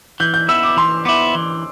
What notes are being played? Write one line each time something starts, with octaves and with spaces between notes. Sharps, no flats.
E3 G6
G6
B3 E4 E6
D6
E3 C6
B3 E4 D6
E3